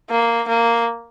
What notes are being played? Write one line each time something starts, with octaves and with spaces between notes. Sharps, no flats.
A#3
A#3